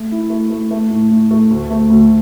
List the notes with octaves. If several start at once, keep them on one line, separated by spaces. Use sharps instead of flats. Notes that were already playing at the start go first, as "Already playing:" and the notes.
Already playing: A3
E4
A3
A3
A3
A2
A2
A3
D2
A3
D2